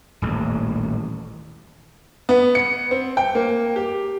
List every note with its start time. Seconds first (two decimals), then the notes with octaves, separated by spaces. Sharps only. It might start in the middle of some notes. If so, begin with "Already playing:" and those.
0.22 D#1 A1
2.29 B3
2.55 C#7
2.91 C4
3.17 G5
3.35 A#3
3.76 G4